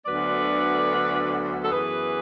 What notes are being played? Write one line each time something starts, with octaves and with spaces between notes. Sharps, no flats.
D2 D3 F#3 B3 B4 D5
A4
F#2 E3 B3 G#4 B4